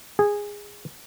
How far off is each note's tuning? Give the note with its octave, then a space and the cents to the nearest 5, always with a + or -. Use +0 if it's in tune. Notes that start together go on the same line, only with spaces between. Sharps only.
G#4 -15